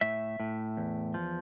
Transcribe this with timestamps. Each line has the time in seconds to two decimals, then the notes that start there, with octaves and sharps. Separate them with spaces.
0.01 A2 E5
0.40 A2
0.77 E2
1.14 F3